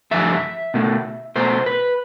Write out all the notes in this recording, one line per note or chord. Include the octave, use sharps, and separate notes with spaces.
G2 F3 A3 E5
B2 A3
B2 A3 C5
B4